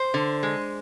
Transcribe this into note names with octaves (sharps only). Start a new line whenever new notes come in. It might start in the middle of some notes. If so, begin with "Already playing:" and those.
Already playing: C5
D3
G#3